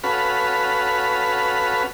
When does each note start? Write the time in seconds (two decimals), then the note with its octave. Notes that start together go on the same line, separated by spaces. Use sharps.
0.04 C#4 F#4 A4 B4 F5 B5